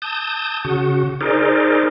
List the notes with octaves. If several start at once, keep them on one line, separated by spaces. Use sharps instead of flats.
A5 D#6 G6
C#3 F#4
D#4 G#4 A#4 C5 D5